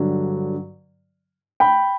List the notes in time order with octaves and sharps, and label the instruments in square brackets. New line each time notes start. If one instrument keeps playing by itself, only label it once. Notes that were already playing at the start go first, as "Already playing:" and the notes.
Already playing: [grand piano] G2 D3 F#3
[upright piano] G5 B5